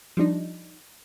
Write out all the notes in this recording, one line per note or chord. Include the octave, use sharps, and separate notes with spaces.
F3 G3 D4 D#4